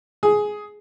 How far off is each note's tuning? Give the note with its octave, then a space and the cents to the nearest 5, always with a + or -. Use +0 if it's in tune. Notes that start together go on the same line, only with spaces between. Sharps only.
G#4 +10